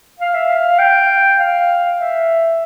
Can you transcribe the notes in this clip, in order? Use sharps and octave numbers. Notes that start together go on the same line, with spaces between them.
F5
E5
F5
G5
F5
E5